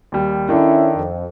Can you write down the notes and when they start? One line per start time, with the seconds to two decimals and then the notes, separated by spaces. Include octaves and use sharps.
0.12 D#2 G3
0.49 D#3 C#4 D4 E4 A4
0.97 F2